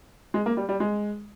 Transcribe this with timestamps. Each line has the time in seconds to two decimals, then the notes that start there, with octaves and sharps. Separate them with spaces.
0.34 G#3
0.46 A#3
0.57 G3
0.69 G3
0.80 G#3